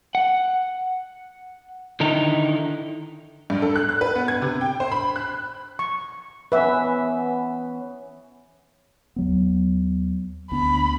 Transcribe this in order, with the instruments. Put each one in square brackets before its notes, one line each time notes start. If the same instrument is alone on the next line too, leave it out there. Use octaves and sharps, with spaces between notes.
[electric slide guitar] F#5
D3 D#3 D#4 E4 A#5
[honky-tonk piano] G2
A4
F#6
F#6
B4
B3
G#6
C3
G5
C5
B5
F#6
[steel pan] C#6
[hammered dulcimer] E3 B3 C#4 [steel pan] B4 E5
[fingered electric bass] D#2 F#3 B3
[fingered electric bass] D2 B3 D4 [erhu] B5